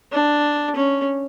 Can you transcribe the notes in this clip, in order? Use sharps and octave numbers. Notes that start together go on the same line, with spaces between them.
D4
C#4